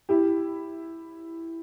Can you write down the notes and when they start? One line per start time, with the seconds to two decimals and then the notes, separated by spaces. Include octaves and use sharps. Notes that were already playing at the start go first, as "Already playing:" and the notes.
0.09 E4 G4